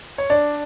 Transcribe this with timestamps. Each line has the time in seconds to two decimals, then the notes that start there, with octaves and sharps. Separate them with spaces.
0.18 C#5
0.30 D4 D5